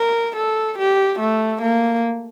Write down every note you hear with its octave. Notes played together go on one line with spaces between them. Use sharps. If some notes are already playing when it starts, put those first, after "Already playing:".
Already playing: A#4
A4
G4
A3
A#3